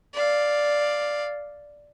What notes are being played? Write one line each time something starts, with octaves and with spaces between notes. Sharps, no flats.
D5 F5